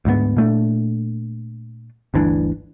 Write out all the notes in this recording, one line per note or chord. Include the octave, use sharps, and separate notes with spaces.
D2 G#2 G#3 B3
A#2 A3 D4
G1 D2 E3 D4